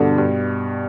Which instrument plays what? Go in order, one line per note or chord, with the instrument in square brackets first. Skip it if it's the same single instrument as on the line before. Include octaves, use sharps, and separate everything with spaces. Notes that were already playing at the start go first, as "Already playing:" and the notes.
Already playing: [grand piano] G2 B2 [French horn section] D3
[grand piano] G2